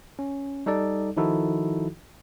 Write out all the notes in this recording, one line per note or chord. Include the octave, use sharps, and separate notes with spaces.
C#4
G3 D#4 A4 D5
D#3 F3 D#4 E4 F#4 A4